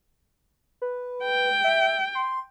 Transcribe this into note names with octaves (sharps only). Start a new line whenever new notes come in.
B4
G5
E5
C6